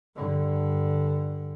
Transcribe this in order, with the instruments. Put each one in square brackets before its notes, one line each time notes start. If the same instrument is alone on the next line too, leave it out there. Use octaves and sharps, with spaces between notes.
[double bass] G2 D3